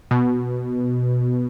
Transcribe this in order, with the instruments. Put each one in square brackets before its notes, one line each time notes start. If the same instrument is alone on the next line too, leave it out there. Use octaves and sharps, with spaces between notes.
[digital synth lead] B2